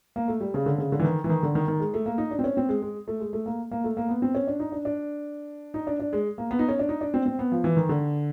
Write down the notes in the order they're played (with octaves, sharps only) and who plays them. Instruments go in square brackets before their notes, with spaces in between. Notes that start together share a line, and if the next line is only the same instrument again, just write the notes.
[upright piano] A#3
A3
G3
C#3
D3
C#3
D3
E3
D#3
E3
D#3
D3
D#3
D#3
G#3
A3
A#3
D#4
D4
C4
C#4
C4
G#3
G#3
A3
G#3
A3
A#3
A#3
A3
A#3
B3
C4
C#4
D4
D#4
D4
D4
D#4
D4
D4
G#3
A#3
B3
D#4
C#4
D4
D#4
D4
C4
C4
B3
F3
E3
D#3
D3